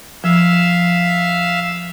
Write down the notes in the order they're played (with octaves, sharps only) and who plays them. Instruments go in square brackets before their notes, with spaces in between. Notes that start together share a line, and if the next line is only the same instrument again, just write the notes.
[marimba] F3 [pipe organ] E5 F5 E6